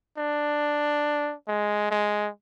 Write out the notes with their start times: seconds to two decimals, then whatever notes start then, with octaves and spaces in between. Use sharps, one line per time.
0.18 D4
1.48 G#3
1.91 G#3